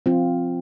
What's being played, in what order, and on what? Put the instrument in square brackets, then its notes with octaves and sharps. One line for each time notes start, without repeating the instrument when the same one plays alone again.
[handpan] F3 C4 F4